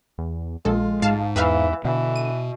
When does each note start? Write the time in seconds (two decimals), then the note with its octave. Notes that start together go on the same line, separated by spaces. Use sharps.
0.18 E2
0.65 A#1 G#3 F4 A4
1.02 G#2 F5 A5
1.36 E2 E3 B4 E5 F5
1.84 B2 D3 E3
2.16 D#7